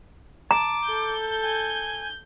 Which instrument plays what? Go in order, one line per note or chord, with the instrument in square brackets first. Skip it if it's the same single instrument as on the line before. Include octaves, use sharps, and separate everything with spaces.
[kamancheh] A5 [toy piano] A#5 [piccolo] D6
[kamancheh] A4 [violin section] G6
[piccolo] G#5